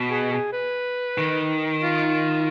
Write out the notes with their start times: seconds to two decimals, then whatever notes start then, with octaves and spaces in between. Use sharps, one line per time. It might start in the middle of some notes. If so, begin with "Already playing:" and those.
Already playing: B2
0.10 G#4
0.32 G#4
0.53 B4
1.18 D#3
1.81 F4